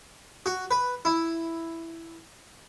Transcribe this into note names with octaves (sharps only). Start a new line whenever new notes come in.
F#4
B4
E4